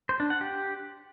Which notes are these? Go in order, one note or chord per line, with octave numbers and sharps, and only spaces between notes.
C5
D4
F#5
G4